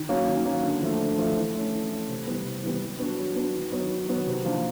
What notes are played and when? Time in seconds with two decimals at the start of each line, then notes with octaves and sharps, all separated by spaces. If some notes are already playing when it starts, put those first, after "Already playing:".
Already playing: D#3
0.09 F#3 A#3 C#4 F#4
0.28 D#3
0.45 F#3 A#3 C#4 F#4
0.63 D3
0.82 F3 A3
1.00 D3
1.18 F3 A3
1.36 E3
1.54 A3 C#4
1.72 E3
1.90 A3 C#4
2.08 C3
2.27 E3 G3 B3
2.45 C3
2.63 E3 G3 B3
2.81 F#3
2.99 B3 D4 F#4
3.18 F#3
3.36 B3 D4 F#4
3.54 D#3
3.72 F#3 B3 D#4 F#4
3.90 D#3
4.08 F#3 B3 D#4 F#4
4.26 C3
4.45 F3 A#3 D4